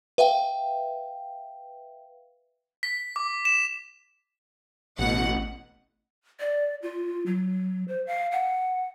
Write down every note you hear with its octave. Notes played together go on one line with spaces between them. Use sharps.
B4 E5 F5 G5
B6
D6
E7
A1 B2 F#5
D5
F4
F#3
C5
F5
F#5